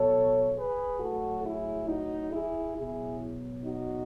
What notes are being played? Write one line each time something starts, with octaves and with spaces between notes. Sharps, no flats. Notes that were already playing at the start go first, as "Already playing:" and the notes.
Already playing: B2 F#3 A4 C#5
G#4 B4
A2 F#3 F#4 A4
E4 G#4
D#4 F#4
E4 G#4
B2 F#3 E4 G#4
D#4 F#4